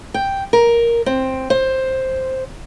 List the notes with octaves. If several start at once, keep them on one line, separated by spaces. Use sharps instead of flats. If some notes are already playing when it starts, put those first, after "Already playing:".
G5
A#4
C4
C5